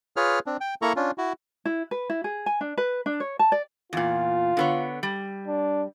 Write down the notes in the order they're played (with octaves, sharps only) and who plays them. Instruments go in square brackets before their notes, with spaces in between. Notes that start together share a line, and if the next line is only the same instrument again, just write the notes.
[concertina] F4 G#4 B4 C#5 F6
C4 D4
G5
A#3 E4 A4 A#5 C#6
C#4 D4 F4
E4 F#4
[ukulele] E4
B4
E4
G#4
G#5
D4
B4
D4
C#5
A5
D5
[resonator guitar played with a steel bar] E2 A#2 [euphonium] F4
[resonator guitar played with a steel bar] D3 B3 C#5
G3
[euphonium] D4